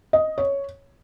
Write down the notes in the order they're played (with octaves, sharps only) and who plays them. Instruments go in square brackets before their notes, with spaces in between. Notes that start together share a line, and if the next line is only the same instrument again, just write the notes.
[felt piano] D#5
C#5